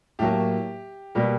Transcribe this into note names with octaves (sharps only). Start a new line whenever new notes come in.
A2 F#3 A#3 G4
B2 G3 A#3 G4